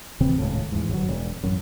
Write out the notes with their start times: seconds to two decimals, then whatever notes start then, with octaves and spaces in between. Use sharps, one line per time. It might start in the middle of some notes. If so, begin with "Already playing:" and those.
0.20 D1 C3 E3 C4
0.38 D#1 C#2 A2
0.72 E2 G#2
0.89 G1 F#3
1.08 E1
1.44 A1 F#2